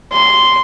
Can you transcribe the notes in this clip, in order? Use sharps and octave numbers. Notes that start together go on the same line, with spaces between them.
C6